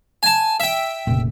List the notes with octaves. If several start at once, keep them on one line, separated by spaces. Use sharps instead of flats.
G#5 A5
E5 G5
F1 A#2 C#3